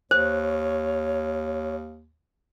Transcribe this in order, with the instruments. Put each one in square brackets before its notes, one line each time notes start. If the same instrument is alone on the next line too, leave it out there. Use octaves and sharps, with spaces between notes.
[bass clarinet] D#2 [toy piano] C5 [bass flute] C#5